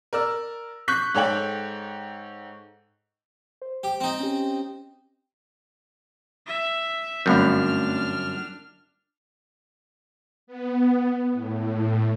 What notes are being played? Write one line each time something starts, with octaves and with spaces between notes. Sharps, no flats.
A#4 D5 E6
C#6 F#6 G6 B6
G#2 A4 C#5 D5 G5 F#7
C5
G4
C4 D#4
C#4 G4
E5
G1 F#2 A3 C4 D4 F6 G6
B3
A2